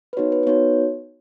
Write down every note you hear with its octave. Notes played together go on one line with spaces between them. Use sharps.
B4
B3 D#4 F#4 C#5
B4
B4
B3 D#4 F#4 C#5